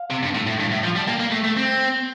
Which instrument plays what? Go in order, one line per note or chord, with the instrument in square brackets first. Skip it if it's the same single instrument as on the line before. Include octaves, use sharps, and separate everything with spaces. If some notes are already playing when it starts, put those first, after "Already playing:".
Already playing: [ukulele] F5
[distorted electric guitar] C3
G2
A2
A2
G2
A2
F3
[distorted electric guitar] G3 [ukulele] A5
[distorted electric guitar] A#3 [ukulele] G5
[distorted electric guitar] A#3
A3
A3
C4